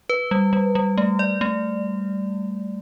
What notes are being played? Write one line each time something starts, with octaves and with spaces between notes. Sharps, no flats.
B4
G3
G3
G3
A3
D5
A3